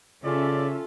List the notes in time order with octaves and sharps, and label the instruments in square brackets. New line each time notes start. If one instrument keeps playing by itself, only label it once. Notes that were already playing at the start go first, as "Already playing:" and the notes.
[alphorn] C#3 [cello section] C#4 E5 [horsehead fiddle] F4 A4 [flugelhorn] D5